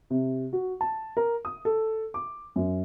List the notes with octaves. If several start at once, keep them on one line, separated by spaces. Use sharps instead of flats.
C3
F#4
A5
A#4
D#6
A4
D6
F#2